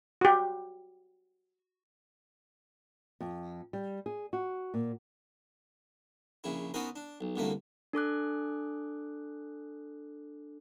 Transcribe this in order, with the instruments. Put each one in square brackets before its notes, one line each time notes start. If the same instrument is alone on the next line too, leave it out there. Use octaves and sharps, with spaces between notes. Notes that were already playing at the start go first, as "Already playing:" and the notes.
[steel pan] F#4 G4
[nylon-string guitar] F2
G3
G#4
F#4
A#2
[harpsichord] A#1 C#3 E4
B3 C#4 D#4 F#4 A#4 C5
D4
B1
C2 B2 D3 A3 A#3
[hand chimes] D4 A4 D6 F#6